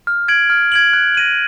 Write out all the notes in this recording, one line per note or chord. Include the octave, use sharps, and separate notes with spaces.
F6
G#6 D7 F#7
F6
G#6 D7 F#7
F#6
A#6 D#7 F#7